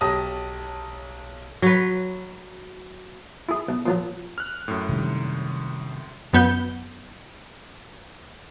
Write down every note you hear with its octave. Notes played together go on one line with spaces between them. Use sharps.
B1 G4 C#5 A5 D#6 A#6
F#3 B4
E4 G#4
B1
A#2 F3 F#3
F6 F#6
F#2 A2
C3 D#3 G3
F#2 B3 G6